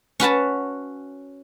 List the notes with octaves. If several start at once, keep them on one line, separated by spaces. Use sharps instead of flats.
C#4 F#4 B4 A5